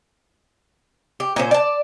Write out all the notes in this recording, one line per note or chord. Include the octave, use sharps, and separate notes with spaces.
G4
A#2 C#4 C5
D5 A5